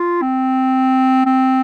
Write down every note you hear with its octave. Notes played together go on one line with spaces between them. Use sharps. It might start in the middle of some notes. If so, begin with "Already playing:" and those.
Already playing: F4
C4
C4